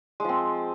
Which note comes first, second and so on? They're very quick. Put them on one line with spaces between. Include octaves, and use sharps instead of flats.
G#3 F3 C4